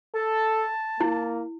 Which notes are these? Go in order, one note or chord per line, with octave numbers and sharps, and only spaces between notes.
A4 A5
A#3 E4